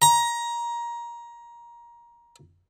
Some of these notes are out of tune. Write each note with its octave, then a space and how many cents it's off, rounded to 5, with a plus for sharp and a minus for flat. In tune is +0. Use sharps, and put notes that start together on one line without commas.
A#5 +20